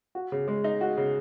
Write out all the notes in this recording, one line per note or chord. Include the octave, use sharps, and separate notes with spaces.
F#4
C#3
G#3
D#4
F#4
C#3